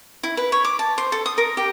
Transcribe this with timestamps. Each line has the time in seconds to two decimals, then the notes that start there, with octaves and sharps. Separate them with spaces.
0.23 E4
0.37 B4
0.52 C#5
0.65 D6
0.79 A5
0.98 C5
1.12 A4
1.26 D#6
1.38 A#4
1.57 G4